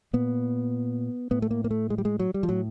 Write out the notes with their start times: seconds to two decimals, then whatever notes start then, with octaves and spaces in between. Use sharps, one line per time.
0.13 A#2 B3
1.31 A2 B3
1.42 A3
1.51 A#3
1.64 A#3
1.71 A3
1.90 G#3
1.98 G3
2.05 G#3
2.19 F#3
2.34 G3
2.43 F3
2.49 A2 F#3